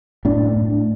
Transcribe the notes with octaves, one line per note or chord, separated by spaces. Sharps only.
A2 D4
A2